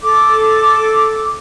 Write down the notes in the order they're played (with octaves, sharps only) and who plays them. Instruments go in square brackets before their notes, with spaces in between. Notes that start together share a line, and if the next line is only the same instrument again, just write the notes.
[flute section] A4 D6